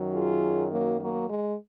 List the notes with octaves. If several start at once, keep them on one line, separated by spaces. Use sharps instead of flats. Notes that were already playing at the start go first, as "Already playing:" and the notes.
Already playing: F#2 D#3 F#3
F4 G#4
F#3 A#3
F#3 A#3
G#3